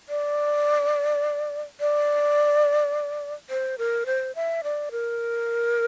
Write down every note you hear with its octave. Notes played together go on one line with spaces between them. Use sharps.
D5
D5
C5
A#4
C5
E5
D5
A#4